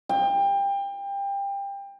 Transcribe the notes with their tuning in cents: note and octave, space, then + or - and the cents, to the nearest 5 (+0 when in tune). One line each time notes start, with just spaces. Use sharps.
G5 +25